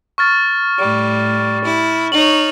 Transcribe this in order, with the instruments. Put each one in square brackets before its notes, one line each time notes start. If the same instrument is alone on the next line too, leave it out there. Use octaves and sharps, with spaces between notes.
[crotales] C#6 F6 A6
[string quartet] A2 G3
E4
[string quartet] D#4 C#5 [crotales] F#7